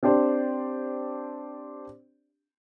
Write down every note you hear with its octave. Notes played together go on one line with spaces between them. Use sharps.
C4 D4 G4 C5 D5